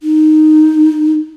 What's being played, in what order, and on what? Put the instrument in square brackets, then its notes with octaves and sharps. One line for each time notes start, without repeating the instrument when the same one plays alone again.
[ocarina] D#4